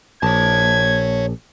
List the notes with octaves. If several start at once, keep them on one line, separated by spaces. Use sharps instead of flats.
A#1 C#5 A5 G#6